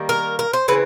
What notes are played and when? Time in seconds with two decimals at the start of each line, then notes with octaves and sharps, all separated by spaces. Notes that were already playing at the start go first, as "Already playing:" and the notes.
Already playing: D#3 G3 A#3
0.09 A#4
0.39 A#4
0.53 C5
0.68 C#3 E3 C4 B4